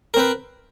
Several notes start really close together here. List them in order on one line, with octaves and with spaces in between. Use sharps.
A#4 C4 B4